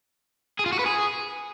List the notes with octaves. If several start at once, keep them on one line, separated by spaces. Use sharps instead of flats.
G#4
F4
F#4
B4
G#4